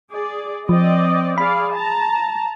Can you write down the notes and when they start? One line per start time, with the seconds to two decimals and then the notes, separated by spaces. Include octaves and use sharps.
0.12 G#4 D5
0.69 F3 C4 D5 D#5
1.38 G#4 D5 F5 B5
1.73 A5 A#5